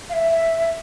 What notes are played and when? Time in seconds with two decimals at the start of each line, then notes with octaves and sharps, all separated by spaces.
0.09 F5
0.13 E5